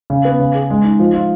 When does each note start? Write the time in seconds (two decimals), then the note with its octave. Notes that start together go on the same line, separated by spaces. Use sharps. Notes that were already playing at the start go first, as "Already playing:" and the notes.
0.10 C#3
0.25 B3
0.40 C#3
0.54 G#4
0.70 G#3
0.84 D#4
0.99 F3
1.14 F4